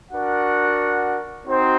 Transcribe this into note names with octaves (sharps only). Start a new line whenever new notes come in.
D4 F#4 A#4 F#5
C4 D#4 F#4 C5